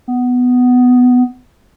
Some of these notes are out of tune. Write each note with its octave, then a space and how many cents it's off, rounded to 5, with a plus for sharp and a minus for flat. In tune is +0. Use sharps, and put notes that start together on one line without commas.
B3 +10